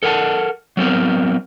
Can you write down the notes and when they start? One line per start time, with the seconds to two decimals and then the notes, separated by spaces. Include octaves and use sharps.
0.03 A4 A#4 F#5 G5 A5
0.77 F#3 B3 C4 A#4